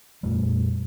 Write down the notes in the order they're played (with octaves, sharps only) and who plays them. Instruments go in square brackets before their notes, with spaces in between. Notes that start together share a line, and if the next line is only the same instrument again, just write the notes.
[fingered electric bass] F2 A#2 G3 A3